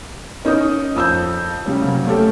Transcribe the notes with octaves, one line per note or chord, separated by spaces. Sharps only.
C#4 D#4 A#4 D#5 D#6
F2 E6 G6
C#3 G3 C#4
C3 F#3 A#3
A3 C#4 G4 A4